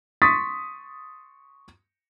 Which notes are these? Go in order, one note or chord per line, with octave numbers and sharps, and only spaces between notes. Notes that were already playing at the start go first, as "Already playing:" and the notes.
C6 C#6 D#6 A6 B6